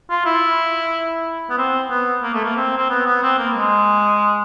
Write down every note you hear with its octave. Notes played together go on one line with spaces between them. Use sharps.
F4
E4
B3
C4
B3
A#3
A3
A#3
C4
C4
B3
B3
C4
A#3
G#3